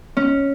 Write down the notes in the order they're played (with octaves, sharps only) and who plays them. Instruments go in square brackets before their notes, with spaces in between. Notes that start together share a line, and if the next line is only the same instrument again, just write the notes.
[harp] C#4